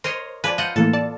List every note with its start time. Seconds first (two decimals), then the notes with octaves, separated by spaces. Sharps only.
0.04 A#4 C5 C#5 D#5 C6
0.44 F3 B4 D5 G#5
0.58 F4 D#5 F#5 G6
0.76 A2 E3 A#3 A4
0.93 D5 A5